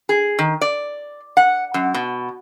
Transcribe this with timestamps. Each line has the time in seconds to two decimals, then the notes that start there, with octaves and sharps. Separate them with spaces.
0.09 G#4
0.39 D#3
0.61 D5
1.37 F#5
1.74 F#2
1.94 B2